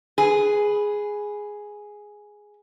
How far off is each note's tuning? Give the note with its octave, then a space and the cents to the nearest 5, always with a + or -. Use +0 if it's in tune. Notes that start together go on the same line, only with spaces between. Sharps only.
G#4 +0 B4 +0